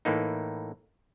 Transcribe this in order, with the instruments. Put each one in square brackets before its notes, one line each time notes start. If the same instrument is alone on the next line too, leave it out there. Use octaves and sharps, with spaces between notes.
[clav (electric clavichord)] A2 E3 A#3 D#4